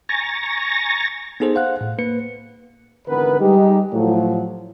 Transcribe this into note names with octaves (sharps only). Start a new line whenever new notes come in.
G#5 A#5 C#6 A6 A#6
B3 D#4 G#4 A4 C5
C5 F5 F#5 F#6
A2
A#3 B4 C#7
G#1 D3 E3 B3 A#4 B4
G3 G#3 D#4 G4
A2 F3 F#3